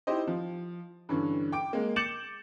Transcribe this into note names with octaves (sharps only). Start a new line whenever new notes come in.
D#4 E4 G4 C5 D#5
F3
G2 D3 E3 C#4
G5 D6 D7
G#3 A#3
D6 G6 A6 C#7 E7 F#7